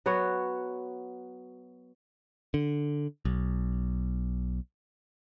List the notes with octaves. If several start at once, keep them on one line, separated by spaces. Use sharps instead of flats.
F#3 B3 F#4 C#5
D3
B1